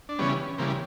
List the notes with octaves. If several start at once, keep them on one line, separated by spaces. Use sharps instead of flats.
D4
C#3 E3 G3 B3 C#4
C#3 E3 G3 A#3 C4